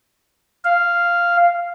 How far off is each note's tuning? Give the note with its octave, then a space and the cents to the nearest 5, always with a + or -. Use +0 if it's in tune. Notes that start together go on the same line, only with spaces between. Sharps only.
F5 -5